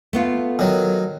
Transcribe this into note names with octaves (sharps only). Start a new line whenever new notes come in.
A3 B3 F4
D#3 F#3